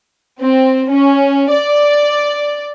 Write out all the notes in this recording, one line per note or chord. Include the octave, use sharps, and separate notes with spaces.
C4
C#4
D5